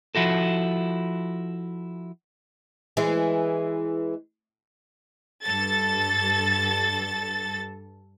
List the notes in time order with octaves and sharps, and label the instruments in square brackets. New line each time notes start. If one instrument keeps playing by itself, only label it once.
[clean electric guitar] F3 E4 F#4 A4
[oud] E3 G#3
[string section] G2 A4 A6